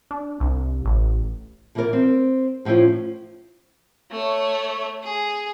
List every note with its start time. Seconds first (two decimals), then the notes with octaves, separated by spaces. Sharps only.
0.11 D4
0.40 C2
0.85 A1
1.75 D3 E3 A#3 B3 A#4 D5
1.93 C4
2.65 A2 F3 C#4 E4 C5
4.11 A3 C#5
5.04 G#4